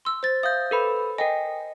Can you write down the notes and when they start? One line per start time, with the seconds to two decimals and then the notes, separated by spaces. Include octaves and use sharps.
0.05 C6 E6
0.23 C5 A6
0.43 E5 F5 D#6 G6
0.71 A4 B4 B5
1.18 A#4 D#5 G5 G#5